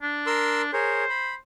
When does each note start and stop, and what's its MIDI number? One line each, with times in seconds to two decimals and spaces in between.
0.02 0.71 62
0.26 0.62 70
0.26 0.62 84
0.26 0.62 88
0.73 1.04 68
0.73 1.04 70
0.73 1.36 72
0.73 1.04 73
1.10 1.34 83